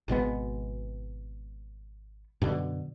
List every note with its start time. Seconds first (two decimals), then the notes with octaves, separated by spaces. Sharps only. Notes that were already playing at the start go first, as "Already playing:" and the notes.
0.08 G#1 B2 G#3 B3
2.42 F#2 B2 D3